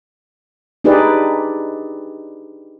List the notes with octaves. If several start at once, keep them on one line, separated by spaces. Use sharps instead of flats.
D4 D#4 G4 G#4 B4 D5